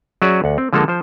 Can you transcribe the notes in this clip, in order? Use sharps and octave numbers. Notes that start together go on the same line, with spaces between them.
F#3 C#4 F#4 G#4 D5 E5
D2 F#5
C4
D3 F3 G#3 A#3 A4
F3 C5